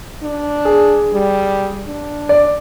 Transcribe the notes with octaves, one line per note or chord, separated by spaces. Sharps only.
D4
G#4
G3
D4
D5